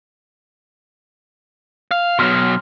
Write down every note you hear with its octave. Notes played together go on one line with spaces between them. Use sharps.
F5
B2 F#3 C6 F6 F#6